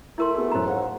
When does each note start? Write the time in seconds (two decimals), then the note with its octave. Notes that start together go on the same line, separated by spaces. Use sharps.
0.18 A3 E4 A#4 C6
0.34 B3 F#4 G#4
0.52 F#2 A2 E3 C5 A#5
0.67 G#2 C#5 F5 F#5